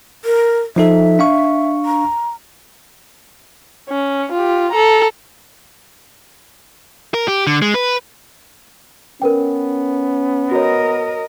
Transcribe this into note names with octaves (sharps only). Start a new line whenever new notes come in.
A#4
F3 D#4 A4 E5
D4 F5 C#6
A#5
C#4
F4 G4
A4 A#5
A#4
G4
D3
G#3
B4
B3 C#4 A#4 B4 G5
F#4 A#4 C#5 D#5